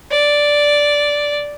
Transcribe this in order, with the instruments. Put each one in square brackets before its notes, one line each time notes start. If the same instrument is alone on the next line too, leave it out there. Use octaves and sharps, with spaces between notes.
[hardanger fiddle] D5